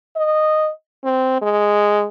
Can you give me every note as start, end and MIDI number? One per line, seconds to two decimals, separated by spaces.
0.16 0.70 75
1.05 1.39 60
1.42 2.06 56